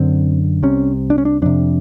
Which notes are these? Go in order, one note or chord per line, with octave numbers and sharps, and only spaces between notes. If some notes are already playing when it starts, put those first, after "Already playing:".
Already playing: F#2 D3 C4
C2 C3 C#4
D4
C#4
D4
F2 C3 D4